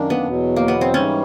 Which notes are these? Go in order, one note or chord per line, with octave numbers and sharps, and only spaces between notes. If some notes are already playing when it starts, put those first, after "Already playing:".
Already playing: F#2 D#3 A#3 D4
B3
E2 B2 F#3
A#3
B3
C4
G#2 E3 G3 C#4